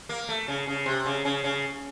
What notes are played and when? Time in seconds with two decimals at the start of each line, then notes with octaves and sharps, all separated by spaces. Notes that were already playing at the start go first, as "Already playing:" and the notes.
0.09 A#3
0.29 A3
0.48 C#3
0.67 C#3
0.86 C3
1.06 C#3
1.25 C#3
1.44 C#3